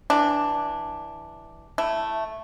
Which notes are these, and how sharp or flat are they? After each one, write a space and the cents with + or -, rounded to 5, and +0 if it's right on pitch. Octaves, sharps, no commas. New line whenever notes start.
E3 -10 D4 +0
A3 +0 E4 +5